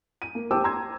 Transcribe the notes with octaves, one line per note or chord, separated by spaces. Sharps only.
D#7
A#3
G4 C5 G5 A5 D6 E6
A#5 C6 E6 G#6